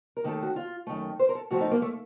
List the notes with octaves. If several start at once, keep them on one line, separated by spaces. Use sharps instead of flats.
A#4
D#2 D#3 A3 A4
F#4
F4
F#2 D#3 A3
C5
A#4
A4
A2 F3 A3 F#4
D#4
A#3
A3